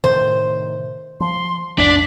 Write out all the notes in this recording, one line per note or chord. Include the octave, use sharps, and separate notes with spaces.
A2 C3 D#3 C5
F3 C6
A1 E2 G#2 D4 D5 B6